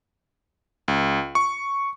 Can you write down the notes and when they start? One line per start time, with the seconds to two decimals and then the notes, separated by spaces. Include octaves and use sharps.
0.88 C#2
1.35 C#6